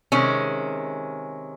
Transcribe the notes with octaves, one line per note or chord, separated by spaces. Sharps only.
C3 D#3 G#3 C#4